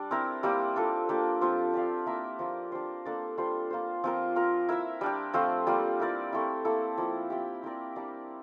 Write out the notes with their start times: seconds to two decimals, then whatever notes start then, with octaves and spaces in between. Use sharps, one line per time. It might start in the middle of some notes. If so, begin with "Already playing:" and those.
Already playing: G3 D4
0.11 C4 E4 A#4
0.43 G3 A#3 E4 G4
0.76 D4 F4 A4
1.09 A#3 D4 G4
1.41 F3 C4 F4 A4
1.74 D4 G4 D5 F5
2.06 A#3 E4 A#4 E5
2.39 F3 A#3 F4
2.72 D4 G4 C5
3.05 A#3 D4 A4 D5
3.38 G3 D4 F4 C5
3.70 A#3 F4 C5
4.04 F3 C4 F4 A#4
4.36 C4 F4 A#4
4.69 E4 A#4 E5
5.01 G3 D4 G4
5.34 F3 A3 C4 F4
5.67 G3 A#3 F4
6.00 E4 A#4 D5
6.33 A3 C4 E4
6.65 A#3 E4 A4
6.97 F3 A#3 E4
7.30 C4 E4 G4
7.63 C4 E4 A#4 D5
7.96 G3 A#3 D4 G4